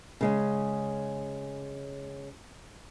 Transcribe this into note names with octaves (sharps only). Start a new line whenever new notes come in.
C#3 G#3 C#4